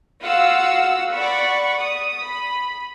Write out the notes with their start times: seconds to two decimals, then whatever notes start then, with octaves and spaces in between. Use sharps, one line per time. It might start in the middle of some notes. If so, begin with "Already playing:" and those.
0.22 F4 F#4 F5 F#5 E6
1.13 D5 F#5 B5 C#6
1.79 D#6
2.24 B5